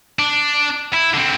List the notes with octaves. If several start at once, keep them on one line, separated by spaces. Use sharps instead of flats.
D4
E4
D3 C4